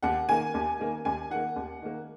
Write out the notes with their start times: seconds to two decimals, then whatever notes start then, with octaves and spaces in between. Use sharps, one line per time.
0.03 D#2 F#5
0.29 D#3 A#3 G#5
0.54 D#2
0.80 D#3 A#3
1.05 D#2 G#5
1.30 D#3 A#3 F#5
1.56 D#2
1.82 D#3 A#3